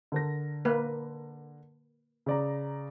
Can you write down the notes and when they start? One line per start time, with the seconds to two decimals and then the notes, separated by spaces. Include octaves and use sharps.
0.12 D3 A#4 A#6
0.65 A#3 B4
2.26 C#3 D5 A#5